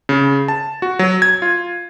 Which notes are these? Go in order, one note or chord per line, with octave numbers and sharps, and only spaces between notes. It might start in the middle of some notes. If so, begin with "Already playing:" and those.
C#3
A5
F#4
F#3
G#6
F4